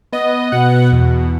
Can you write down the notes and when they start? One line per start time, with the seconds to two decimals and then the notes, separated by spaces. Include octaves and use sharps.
0.12 B3 D#5
0.52 B2 F#5
0.92 E2